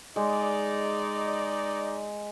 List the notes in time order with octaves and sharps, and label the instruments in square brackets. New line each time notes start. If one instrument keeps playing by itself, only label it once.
[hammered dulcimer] G#3 [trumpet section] D#4 D5